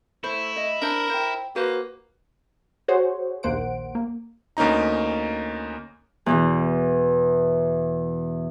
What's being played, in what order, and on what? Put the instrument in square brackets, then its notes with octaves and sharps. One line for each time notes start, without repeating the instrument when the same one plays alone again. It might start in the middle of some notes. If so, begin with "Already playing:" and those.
[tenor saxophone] A3 [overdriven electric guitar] E4 [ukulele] C5
[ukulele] D#5
[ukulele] D4 C5 [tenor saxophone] A#4
[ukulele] C5 G5
[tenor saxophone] A#3 [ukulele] F#4 B4 C5
[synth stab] F#4 G#4 C5 C#5
A#1 D#2 A#3 C5 F#5 D7
A#3
[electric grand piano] D2 A#3 C#4 D#4 A#5
[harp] E2 B2 E3